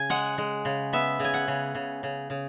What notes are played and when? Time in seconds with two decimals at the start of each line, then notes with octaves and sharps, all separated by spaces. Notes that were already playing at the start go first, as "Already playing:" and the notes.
Already playing: C#3 G#5
0.10 G#3 F#5
0.38 G#3
0.65 C#3
0.93 B3 E5
1.20 C#3 G#5
1.34 F#5
1.48 C#3
1.75 C#3
2.03 C#3
2.30 C#3